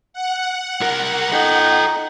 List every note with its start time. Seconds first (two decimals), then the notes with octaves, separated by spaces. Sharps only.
0.13 F#5
0.81 C2 A#4
1.33 D#4 A4 G5